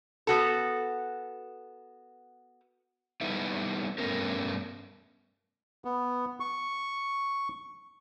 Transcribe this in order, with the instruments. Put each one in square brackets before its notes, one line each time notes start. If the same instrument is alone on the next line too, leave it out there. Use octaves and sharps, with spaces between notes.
[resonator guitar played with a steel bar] B3 F#4 A4
[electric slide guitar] G3 B3 D#4 E4
G2 A3 B3 C#4 A#4
[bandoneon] B3
C#6